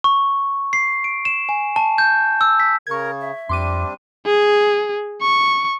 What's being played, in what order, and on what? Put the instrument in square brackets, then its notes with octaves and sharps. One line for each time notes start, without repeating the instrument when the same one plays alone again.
[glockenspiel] C#6
C7
D7
E7
G#5
A5
G6
E6
B6
[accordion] C#3 [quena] A#4 [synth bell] C#6 G#6
[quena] E5
[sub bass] F2 [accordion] G3 C4 D4 [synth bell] C6 D6 D#7
[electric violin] G#4
C#6